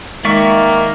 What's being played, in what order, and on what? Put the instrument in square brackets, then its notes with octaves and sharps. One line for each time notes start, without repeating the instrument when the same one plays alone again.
[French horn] D#3 [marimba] G#3 [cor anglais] A#3 [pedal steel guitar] D5 E5 C#6